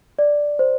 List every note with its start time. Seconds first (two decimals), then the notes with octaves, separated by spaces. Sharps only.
0.19 D5
0.59 C5